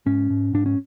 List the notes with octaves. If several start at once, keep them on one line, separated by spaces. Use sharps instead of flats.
G#2 C#4
G#2
G#2 D4
C#4